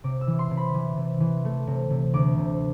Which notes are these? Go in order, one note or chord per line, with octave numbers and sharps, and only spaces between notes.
C3 D6
E6
E3
C6
C3
B5
E3
C3
E3
A3
C3
C3
D2 D6
C3